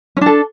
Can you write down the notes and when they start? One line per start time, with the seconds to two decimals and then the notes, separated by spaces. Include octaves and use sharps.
0.17 C#4
0.21 D4
0.26 A4